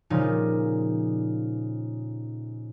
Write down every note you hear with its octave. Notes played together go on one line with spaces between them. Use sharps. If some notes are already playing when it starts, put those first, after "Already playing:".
A#2 C#3 F3 G3 D#4